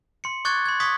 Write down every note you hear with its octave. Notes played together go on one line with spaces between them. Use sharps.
C6 C#7
C#6 D6 F#6 G#6 A6
C6 G#6
C#6 D#6 G#6 B6